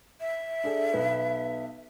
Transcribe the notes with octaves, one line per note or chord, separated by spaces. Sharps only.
E5
D4 G#4 A4
B1 B3